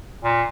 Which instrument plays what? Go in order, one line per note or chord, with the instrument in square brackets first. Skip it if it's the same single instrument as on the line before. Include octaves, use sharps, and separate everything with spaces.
[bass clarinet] A#2